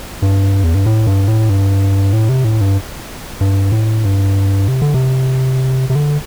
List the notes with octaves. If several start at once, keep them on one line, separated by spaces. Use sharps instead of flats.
G2
E2
G2
A2
G2
A2
G2
A2
C3
A2
G2
G2
A2
G2
C3
D3
C3
C3
D3